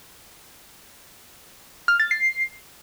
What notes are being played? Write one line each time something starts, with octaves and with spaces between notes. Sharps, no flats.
F6
A6
C7